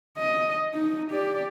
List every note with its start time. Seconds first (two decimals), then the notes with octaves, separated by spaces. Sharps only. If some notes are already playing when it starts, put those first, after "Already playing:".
0.18 D#5
0.74 D#4
1.11 G4 D5